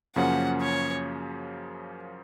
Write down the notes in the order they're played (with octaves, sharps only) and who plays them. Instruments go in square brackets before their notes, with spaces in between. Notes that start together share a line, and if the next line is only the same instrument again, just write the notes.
[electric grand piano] F#2 C#3 F3 A#3 C#4 [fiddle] F#5
[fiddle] C#5